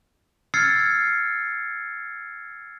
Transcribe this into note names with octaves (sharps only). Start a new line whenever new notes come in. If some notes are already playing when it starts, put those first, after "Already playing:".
E6 F6 G#6 A6 C7 C#7